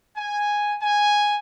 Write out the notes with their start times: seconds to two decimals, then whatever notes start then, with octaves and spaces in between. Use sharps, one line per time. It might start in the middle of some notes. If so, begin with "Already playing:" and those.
0.17 G#5
0.81 G#5